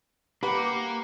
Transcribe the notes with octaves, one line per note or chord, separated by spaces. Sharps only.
A#3 G4 B4 F#5 B5